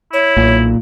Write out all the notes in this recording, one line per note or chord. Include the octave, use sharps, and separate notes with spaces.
E4 C#5
B1 A#2